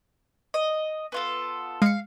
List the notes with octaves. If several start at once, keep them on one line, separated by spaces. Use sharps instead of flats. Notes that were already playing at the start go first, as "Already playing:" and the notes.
D#5
B3 F4 A4
G#3 F5 C#7